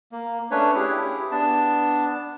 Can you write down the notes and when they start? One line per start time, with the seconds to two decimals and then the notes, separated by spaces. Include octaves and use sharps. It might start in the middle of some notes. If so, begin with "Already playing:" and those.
0.12 A#3
0.51 A3 C#4 D4 B4 C#5
0.75 E4 G4 G#4
1.31 B3 D4 A5